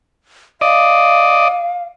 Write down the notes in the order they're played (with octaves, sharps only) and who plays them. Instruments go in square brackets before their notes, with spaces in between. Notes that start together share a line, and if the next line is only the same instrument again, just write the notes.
[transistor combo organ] D5 D#5 [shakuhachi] F5